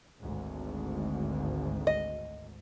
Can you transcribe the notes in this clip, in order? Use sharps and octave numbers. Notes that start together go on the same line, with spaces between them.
G#1 D2 G#2
D#5